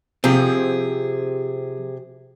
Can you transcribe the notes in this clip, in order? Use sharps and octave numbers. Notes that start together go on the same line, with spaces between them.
C3 F3 C4 G4 G#4